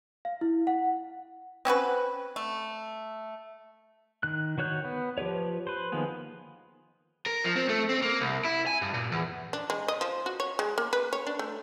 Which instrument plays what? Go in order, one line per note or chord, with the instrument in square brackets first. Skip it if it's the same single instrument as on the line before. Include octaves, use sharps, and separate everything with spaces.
[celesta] F5
E4
F#5
[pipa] C4 C#4 F#4 B4
A3
[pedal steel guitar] D#3 F#6
D#3 F#4 C#5 F#6 G6
B3
F3 G4 B4 C#5
B4 C5
D#3 F3 A#3 B3 G#4
[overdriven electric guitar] A#4
F3
C4
A3
C4
A#3
C2
E4
G#5
G2
A#2
E2
[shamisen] D4
G#3
D#5
F3
F#4
C#5
G#3
A#3
B4
C#5
D4
A3